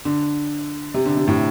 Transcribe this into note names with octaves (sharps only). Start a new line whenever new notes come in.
D3
C3
D3
C3
A2